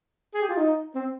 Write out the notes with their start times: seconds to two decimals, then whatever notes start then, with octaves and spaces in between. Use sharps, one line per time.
0.34 G#4
0.42 G4
0.49 F4
0.57 D#4
0.95 C4